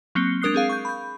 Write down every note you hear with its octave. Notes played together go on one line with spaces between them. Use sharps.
F#3 A#3 C4 C#7 G7
G#3 D4 A#4 D#6 F#6 C7
C4 G#4 F5
C#6 G6
B5 G6